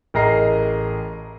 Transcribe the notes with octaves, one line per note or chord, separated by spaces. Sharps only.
A1 G#4 A#4 D#5 A#5 C7